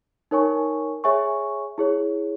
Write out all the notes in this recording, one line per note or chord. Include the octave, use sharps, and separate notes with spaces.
D#4 A#4 C#5 G#5 C#6
G#4 C#5 E5 G#5 C#6
E4 G#4 C#5